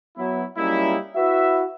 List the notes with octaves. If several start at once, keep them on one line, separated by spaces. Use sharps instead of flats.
F#3 B3 E4
F#3 G3 A#3 C#4 D#4 E4
E4 F#4 B4 E5